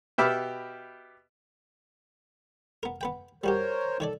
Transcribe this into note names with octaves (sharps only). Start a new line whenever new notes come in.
B2 G4 E5 B5 D6 F6
B3 A#4
B3 B4 G5
G3 F#4 G4 A#4 C5 C#5
D#3 A4 C#5 D5